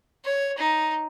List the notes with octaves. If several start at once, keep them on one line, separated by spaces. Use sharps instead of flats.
C#5
D#4